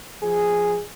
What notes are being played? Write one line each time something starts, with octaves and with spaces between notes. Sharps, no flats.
F3 G#4